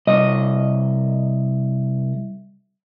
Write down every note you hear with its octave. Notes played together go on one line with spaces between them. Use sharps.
C2 D#5